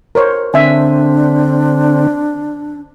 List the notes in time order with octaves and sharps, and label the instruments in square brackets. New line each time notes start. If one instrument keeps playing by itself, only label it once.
[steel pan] A#4 C5 C#5
[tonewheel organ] D3 C4 [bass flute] D4 [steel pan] E5 G#5